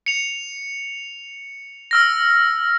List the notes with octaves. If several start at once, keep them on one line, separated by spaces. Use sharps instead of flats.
C#7 F7
E6 F6 A#6